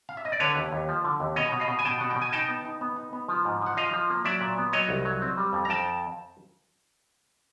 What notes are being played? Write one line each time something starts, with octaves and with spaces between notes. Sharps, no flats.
F5
E5
D#5
D5
D3 B4 C#5
D#2
D#2
F3
D3
D#2
B2 C#5 D#5
B2
D#5 F5
B2
G#5
B2 G5 A5
B2 F#5
G5
B2
G#5
D#4 G5 A5
B3
D#4
B3
D#4
B3
F3
G#2
F3
F#5
F3 D#5 F5
F3
A#3
F#3 D5 E5
A#2
B3
F#3 C#5 D#5
C2
F#3
C4
G3
F2
A#5
F2 G5 A5